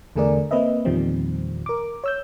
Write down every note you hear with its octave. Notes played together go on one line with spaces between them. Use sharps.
E2 D3 A3 G#4 A#4 D5
A#3 C4 B4 D#5 E5
E2 A#2 D#3 F3 G3 C4
A#4 D6
C#5 E6 G6